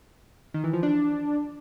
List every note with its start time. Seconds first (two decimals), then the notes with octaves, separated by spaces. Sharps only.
0.54 D#3
0.64 E3
0.73 F3
0.83 D4